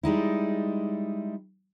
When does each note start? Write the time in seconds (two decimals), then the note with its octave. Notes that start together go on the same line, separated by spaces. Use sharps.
0.03 G3 G#3 D#4 E4